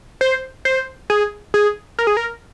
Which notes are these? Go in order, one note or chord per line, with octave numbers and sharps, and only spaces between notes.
C5
C5
G#4
G#4
A#4
G#4
A#4